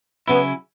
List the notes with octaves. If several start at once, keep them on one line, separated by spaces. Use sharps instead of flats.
C#3 F#3 B3 C#4 E4